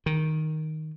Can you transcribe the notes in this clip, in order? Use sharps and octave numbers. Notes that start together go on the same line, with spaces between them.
D#3